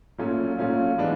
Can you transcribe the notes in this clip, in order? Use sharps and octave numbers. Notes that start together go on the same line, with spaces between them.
A#2 F#3 A3 C#4 F4
A#2 F#3 A3 C#4 F4
E3 G#3 B3 D4